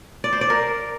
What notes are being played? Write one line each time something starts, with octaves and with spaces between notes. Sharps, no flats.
D5
C5
D5
A#4